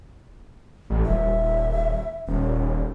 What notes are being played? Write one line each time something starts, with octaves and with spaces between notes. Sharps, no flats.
A1
D#1 E5
D#1 C#4